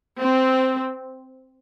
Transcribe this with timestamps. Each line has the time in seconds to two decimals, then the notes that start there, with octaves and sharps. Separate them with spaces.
0.20 C4